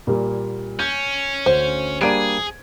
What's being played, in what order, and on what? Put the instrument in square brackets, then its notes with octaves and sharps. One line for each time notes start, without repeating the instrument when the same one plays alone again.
[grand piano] A#2 G3 A#3
[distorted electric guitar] C#4 [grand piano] G6
[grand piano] D2 [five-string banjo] C5
[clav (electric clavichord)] G3 A#3 D4 [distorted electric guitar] G#4 [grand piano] G#6 D7 D#7